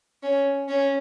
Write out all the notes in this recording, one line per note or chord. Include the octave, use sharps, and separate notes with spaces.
C#4
C#4